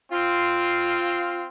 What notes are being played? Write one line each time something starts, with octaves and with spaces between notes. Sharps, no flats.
C4 F4